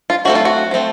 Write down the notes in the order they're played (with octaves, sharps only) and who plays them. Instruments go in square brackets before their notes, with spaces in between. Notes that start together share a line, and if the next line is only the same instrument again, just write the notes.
[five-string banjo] F4
F#3 A3 C4 F#4
F4
F#4
F3 A3 C4